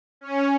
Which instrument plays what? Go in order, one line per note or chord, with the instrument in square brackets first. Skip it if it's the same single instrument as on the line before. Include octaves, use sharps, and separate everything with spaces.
[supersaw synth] C#4